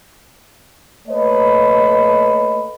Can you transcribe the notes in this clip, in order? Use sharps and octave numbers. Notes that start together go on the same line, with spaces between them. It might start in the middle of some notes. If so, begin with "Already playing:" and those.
A3 A#3 B4 C#5 D#5